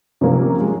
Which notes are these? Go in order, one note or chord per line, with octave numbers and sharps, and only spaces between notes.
C3 F3 A#3 C#4
G#3